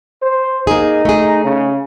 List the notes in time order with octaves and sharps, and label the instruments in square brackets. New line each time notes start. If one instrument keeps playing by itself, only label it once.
[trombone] C5
[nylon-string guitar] A#3 G#4 [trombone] D#4
[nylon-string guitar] A3 G#4
[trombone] C#3